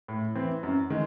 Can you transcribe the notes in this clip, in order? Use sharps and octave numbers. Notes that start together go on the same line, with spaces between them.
A2
E3 C4
F#2
D#3 G#3